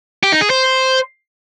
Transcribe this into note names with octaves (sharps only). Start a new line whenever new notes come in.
G4
D#4
G#4
C5